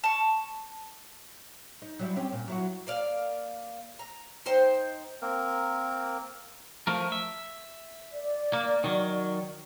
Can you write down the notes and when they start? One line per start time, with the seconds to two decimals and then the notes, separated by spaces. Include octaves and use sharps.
0.04 A5 C#6
1.82 D#4
1.99 F#3 G3 E4
2.16 C4 C#4 G4
2.33 A#2
2.48 F#3 E4 F#4
2.87 A#3 D5 F5
3.99 A#5
4.46 D#4 C5 G5
5.22 A#3 C4 A#4
6.87 F3 A3 A#4
7.12 E5
8.13 D5
8.53 A#3
8.84 D#3 F#3